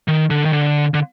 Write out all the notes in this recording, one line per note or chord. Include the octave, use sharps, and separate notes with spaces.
D#3
D3
D#3
D3
D3